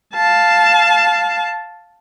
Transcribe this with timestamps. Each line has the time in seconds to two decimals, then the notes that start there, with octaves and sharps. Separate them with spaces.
0.14 F5 A5